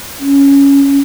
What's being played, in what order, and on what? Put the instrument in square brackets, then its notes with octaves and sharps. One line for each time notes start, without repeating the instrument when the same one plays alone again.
[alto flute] C#4